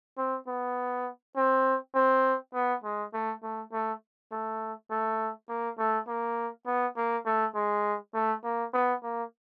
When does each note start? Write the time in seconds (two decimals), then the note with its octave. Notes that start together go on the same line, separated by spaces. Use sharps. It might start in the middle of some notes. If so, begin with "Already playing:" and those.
0.17 C4
0.48 B3
1.36 C4
1.95 C4
2.54 B3
2.84 G#3
3.13 A3
3.43 A3
3.73 A3
4.32 A3
4.91 A3
5.49 A#3
5.78 A3
6.08 A#3
6.66 B3
6.97 A#3
7.26 A3
7.55 G#3
8.14 A3
8.44 A#3
8.73 B3
9.03 A#3